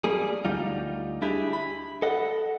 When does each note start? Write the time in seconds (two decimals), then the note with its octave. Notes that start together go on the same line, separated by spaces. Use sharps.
0.04 G3 A#3 G#4
0.45 D2 G3 D#4 F4
1.22 D4 E4 G4 G#4
1.53 B5
2.02 A4 D#5 F#5